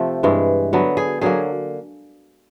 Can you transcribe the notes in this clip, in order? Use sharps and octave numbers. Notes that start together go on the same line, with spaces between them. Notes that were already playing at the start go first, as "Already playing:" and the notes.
Already playing: C3 F3 A3 C4
G2 E3 G#3
D3 F#3 B3
G#4
D3 F#3 A#3 G#4